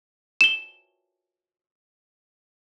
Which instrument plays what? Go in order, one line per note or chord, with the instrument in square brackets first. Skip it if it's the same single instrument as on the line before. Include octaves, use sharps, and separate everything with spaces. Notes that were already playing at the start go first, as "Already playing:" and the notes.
[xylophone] E7 G7